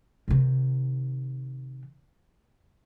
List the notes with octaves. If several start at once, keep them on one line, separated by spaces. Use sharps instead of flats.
C3 D#3